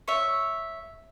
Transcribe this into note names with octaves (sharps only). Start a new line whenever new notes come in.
C#5 E5